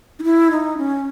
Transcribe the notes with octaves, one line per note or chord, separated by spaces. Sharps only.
D#4
E4
D#4
C#4